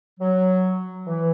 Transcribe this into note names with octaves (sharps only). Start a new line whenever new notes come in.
F#3
E3